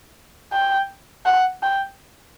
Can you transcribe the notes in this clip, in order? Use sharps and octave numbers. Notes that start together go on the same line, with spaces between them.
G5
F#5
G5